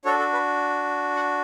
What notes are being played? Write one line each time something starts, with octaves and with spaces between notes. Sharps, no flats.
D4 F#4 A4 C#5
A4
B4
F#5